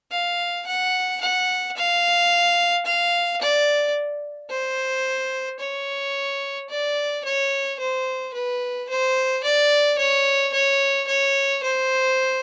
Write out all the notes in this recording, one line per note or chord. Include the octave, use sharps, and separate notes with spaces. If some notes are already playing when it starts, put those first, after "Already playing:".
F5
F#5
F#5
F5
F5
D5
C5
C#5
D5
C#5
C5
B4
C5
D5
C#5
C#5
C#5
C5